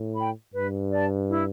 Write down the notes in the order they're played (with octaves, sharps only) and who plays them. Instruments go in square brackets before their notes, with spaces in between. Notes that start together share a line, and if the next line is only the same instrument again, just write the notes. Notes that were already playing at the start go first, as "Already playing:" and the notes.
Already playing: [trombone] A2
[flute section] G5 B5
[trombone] G2 [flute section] B4
[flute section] D5 A5
E4